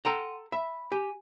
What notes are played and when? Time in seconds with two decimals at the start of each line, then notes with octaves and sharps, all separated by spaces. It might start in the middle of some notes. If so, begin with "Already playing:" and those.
0.05 A4 F#5 G5 A#5 C6 D#7
0.52 E5 B5
0.92 G4 G#5 D#7